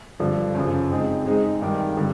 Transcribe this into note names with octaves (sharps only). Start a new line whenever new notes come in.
G2 D3 F3
F#2 C#3 F3
G#3 C4 D#4 G#4
G#3 C4 D#4 G#4
G2 D#3 G3
D3 G3